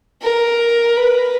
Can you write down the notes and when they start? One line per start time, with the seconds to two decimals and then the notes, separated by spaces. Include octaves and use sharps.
0.22 A#4
0.96 B4